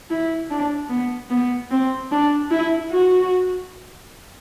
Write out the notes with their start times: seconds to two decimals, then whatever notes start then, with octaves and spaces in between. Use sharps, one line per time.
0.10 E4
0.50 D4
0.90 B3
1.30 B3
1.71 C4
2.11 D4
2.51 E4
2.91 F#4